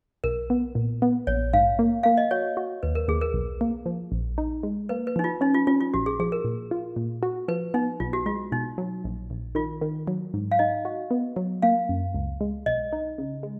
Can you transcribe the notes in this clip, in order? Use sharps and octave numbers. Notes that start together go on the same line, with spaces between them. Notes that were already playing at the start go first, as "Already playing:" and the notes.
B1 A#4
B3
A#2
B3
A#1 C#5
G#2 F5
A#3
A#3 F5
D#5
F#4 C#5
F#4
D#2 B4
A#4
D#2 G#4
A#4
B1
A#3
F3
A#1
D#4
G#3
A#3 B4
B4
F3 D#4
F4
C#4 D#4
F4
C#4 F4
F4
A#1 F#4
G#4
F3 G#4
A#4
A#2
F4
A#2
F#4
F3 B4
B3 D#4
B1 F4
F#4
G#3 F4
B2 D#4
F#3
A#1
A#1
D#3 F4
D#3
F#3
G#2
F5
D#4 D#5
F#4
B3
F#3
A#3 F5
F#2
C#2
G#3
B1 D#5
D#4
C#3
G#3